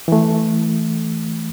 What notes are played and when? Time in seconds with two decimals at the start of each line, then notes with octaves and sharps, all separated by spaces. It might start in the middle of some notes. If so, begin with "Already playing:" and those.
0.08 E3 A3